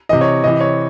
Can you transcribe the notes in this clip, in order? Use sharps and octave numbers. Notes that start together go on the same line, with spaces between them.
C3 E3 D#5
C#5
C3 E3 D#5
C#5